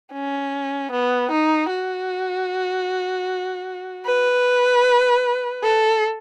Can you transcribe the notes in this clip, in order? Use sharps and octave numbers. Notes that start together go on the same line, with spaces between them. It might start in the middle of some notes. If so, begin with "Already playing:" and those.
C#4
B3
D#4
F#4
B4
A4